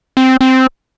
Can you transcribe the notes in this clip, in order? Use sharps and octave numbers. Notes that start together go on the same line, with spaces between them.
C4
C4